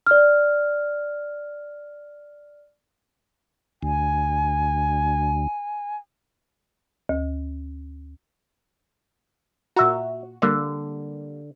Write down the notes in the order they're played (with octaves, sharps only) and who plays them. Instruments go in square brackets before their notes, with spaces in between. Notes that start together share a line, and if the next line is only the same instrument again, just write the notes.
[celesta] D5 F6
[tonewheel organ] D2 [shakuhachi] G#5
[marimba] D2
[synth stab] A#2 F#4 [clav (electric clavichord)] E5 A#5
[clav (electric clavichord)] D3 [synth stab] G3 A#3